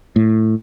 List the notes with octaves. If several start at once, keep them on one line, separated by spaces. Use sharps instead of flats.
A2